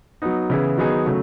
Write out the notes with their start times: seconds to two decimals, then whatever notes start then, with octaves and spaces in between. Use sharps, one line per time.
0.22 F#3 B3 D#4
0.50 C#3 E3 B3 E4 G#4
0.78 D#3 F#3 B3 D#4 G#4
1.06 C#3 F#3 A3